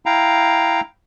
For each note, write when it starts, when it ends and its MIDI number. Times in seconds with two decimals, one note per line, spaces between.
0.06 0.81 64
0.06 0.81 77
0.06 0.81 79
0.06 0.81 82